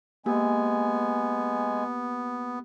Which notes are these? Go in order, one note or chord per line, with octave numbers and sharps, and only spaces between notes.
G#3 A#3 B3 G4 G#5